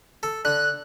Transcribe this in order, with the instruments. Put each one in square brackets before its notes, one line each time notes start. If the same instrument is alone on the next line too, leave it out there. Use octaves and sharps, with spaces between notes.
[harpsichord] A4
[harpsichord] D3 [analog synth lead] F#6